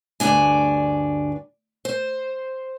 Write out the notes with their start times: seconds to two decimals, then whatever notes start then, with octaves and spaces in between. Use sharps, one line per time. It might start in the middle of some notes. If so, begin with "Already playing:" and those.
0.20 D2 G2 D4 G#5
1.85 C5